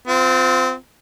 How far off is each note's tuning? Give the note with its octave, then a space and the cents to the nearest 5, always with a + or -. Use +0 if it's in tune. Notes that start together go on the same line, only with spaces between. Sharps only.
C4 -25 F4 +10